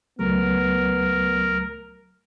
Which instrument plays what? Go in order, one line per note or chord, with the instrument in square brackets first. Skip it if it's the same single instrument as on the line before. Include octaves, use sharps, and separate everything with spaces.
[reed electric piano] C#2 F#3 A3 [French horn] B3 [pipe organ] A#4